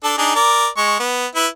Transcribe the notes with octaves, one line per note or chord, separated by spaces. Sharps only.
D4 A4
D4 D#4 G#4
A#4 D5
G#3 C#6
B3
E4 B4